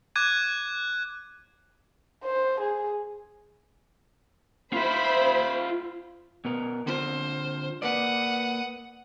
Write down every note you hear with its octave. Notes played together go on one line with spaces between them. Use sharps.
D6 F#6 G#6 D#7
C5
G#4
F4 C5 E5 B5
B2 B3 A#4
D3 C4 F4 C5
A#3 B4 D5 F#5 D#6